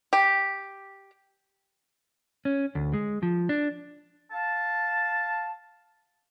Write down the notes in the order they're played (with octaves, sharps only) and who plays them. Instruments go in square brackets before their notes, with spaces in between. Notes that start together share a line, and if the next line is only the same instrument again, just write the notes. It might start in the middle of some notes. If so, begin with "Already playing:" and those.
[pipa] G4
[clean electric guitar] C#4
D2
G#3
F3
D4
[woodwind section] F5 A5